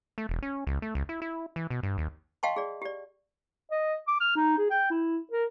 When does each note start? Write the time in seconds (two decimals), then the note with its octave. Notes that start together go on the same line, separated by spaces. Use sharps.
0.18 A3
0.29 E1
0.43 C#4
0.67 C#2
0.82 A3
0.95 C#2
1.09 E4
1.22 E4
1.56 E3
1.70 B2
1.83 G2
1.98 D#2
2.43 D#5 F5 G5 A5 C6 C#6
2.56 G#4 D5
2.82 G4 D5
3.71 D#5
4.08 D6
4.20 F6
4.36 D#4
4.58 G#4
4.70 G5
4.91 E4
5.32 A#4